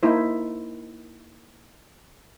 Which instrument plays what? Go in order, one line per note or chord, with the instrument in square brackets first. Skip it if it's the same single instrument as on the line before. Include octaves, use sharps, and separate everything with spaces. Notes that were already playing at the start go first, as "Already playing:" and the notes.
[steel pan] A#3 D#4 E4 C5